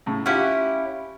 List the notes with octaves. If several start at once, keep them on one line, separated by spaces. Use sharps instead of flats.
A2 C#3
C#4 E4 F4 G4 F#5